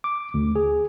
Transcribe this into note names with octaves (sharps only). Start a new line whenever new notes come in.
D6
D2
G#4